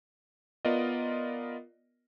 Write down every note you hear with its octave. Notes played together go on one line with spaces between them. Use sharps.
B3 F4 A#4 D5 D#5